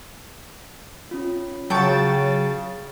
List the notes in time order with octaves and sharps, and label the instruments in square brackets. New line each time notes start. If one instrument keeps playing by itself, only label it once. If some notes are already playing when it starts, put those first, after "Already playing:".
[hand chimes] C#4 F4
[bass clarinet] C#3 [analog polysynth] F#3 A6 [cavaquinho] G5 A5 C#6